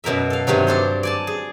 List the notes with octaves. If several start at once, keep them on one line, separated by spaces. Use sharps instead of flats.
F#2 B2 A#4 E5
A4 F5
G2 C3 D#3 F#3
D4 A4 C5
D5 G#5 A5
G#4